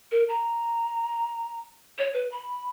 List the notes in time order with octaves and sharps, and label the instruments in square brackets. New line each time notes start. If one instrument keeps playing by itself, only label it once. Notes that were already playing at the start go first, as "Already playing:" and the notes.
[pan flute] A#4
A#5
C#5
B4
B5